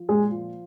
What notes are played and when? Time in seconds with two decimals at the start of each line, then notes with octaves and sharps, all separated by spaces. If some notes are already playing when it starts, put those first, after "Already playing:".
Already playing: F3
0.09 A#2 G#3 G#4
0.31 F3